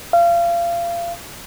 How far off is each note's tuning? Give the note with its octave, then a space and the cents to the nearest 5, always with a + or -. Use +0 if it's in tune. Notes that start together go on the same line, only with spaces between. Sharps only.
F5 -30